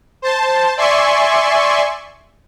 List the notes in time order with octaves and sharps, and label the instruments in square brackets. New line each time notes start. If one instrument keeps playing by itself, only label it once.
[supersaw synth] C5 A5
D5 E5 G#5 C6 C#6